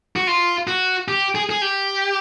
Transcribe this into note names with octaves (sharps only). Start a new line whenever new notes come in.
F#4
F4
F#4
G4
G#4
G#4
G4